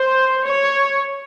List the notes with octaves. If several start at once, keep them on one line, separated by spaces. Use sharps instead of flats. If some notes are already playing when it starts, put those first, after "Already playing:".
Already playing: C5
C#5